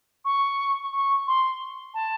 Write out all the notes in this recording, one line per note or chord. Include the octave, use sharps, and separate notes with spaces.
C#6
C#6
C6
A5